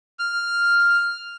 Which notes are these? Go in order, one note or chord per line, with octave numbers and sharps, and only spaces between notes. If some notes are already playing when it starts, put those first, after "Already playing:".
F6